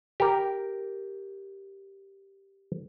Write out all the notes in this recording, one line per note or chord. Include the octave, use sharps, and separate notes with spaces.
G4 A#4